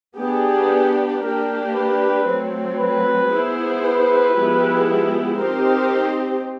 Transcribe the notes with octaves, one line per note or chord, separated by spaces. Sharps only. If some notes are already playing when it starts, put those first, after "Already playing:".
B3 D4 G4 G#4
A#3 D4 G4 A#4
B4
F#3 A3 C4
B4
B3 E4 G#4 C5
B4
F3 G#3 B3 E4 G4
C4 D#4 G4 A#4 C5